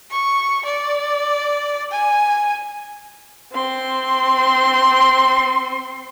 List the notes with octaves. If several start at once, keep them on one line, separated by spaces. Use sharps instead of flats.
C#6
D5
G#5
C4 C6